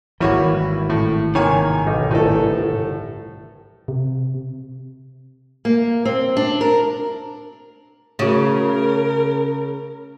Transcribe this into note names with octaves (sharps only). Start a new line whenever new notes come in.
G#1 E3 G3 A#3 E4 F#4 C#5
A2
C3 D#3 A#3 C#5 G#5
B1 G3 D#4
G1 C2 A2 A4 G#5
C3
A#3
C4
D4
A#4
C#3 A3 F#4 A#4